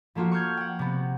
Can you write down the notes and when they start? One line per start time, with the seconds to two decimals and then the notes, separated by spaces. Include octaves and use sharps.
0.15 F3 A3 A#3 F4 F#4
0.32 C#6 F6 G6 G#6
0.57 F#5 G5
0.79 C3 B3